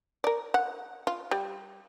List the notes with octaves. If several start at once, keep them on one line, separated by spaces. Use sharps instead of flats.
A#4 D5
F#5
F4
G3